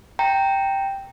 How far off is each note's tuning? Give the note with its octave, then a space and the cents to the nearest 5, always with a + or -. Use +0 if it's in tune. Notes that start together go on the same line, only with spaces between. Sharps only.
G5 +0 A#5 -15